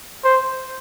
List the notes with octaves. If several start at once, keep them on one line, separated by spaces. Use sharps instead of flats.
C5